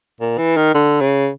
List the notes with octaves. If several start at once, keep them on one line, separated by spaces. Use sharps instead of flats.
A#2
E3
D#3
D3
C#3